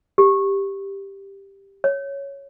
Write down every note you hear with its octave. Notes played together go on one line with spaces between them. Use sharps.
G4
C#5